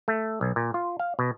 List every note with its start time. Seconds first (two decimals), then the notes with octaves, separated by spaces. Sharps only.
0.08 A3
0.41 B1
0.56 A#2
0.74 F4
0.99 F5
1.19 B2